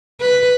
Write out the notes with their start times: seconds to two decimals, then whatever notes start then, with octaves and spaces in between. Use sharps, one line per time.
0.21 B4